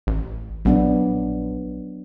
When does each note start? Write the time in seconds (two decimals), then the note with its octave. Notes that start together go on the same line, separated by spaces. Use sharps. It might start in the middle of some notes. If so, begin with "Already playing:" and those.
0.07 A1
0.65 A#1 F#3 B3 D4